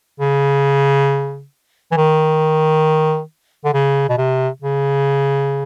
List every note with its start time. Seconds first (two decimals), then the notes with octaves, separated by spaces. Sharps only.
0.20 C#3
1.91 E3
1.97 D#3
3.65 D3
3.74 C#3
4.09 B2
4.18 C3
4.62 C#3